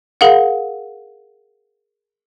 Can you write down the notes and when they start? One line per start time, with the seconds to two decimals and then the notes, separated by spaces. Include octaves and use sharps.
0.21 G#4 A#4 F5 F#5